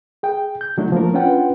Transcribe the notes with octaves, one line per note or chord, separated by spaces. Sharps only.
G#4 G5
G6
C#3 F#3 A3 D4 E4 F#4
F3 A3 A#3 A#4
C#4 D4 F4 B4 F#5 G5